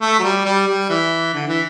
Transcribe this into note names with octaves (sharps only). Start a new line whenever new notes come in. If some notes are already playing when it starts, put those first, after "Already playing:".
A3
F#3
G3
G3
G3
E3
D3
E3